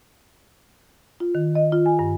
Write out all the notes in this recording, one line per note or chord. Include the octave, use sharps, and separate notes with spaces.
F4
D#3
D#5
F4
G#5
G2